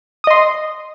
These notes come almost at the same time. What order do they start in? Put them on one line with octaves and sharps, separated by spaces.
D#6 D#5 C6